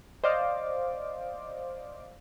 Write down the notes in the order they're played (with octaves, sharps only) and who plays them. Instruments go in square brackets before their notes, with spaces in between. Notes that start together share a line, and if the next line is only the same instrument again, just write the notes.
[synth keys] C5 D5 D#5 F5 D6